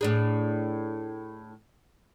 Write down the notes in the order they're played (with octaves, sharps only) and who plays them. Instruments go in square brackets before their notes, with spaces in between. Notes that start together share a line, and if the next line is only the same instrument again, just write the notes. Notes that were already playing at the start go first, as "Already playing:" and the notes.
[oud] A2 D4 G#4